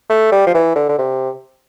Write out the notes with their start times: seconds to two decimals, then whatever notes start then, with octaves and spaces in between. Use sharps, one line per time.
0.10 A3
0.32 G3
0.47 F3
0.54 E3
0.76 D3
0.89 D3
0.99 C3